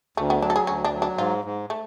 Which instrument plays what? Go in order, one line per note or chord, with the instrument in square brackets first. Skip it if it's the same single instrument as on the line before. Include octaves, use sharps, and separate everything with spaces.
[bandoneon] D2 [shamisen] A3
[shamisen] B3
[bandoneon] F#3 [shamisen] D4
[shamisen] A4
G#4
[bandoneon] D2 [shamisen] C#4
[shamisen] D4
[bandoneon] F#3
[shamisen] D4
[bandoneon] G#2 [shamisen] F4
[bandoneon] G#2
[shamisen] A3